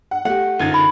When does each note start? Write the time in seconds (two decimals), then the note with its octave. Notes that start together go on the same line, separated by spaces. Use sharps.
0.11 F#5
0.25 A3 G4 F#5
0.59 F#1 D3 D#4 F4 G#6 A6
0.74 B5